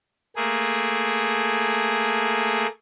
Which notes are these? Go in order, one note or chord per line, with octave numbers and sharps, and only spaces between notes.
A3 A#3 G#4